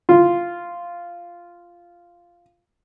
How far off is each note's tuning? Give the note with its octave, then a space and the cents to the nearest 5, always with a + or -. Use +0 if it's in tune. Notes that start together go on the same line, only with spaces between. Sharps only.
F4 -5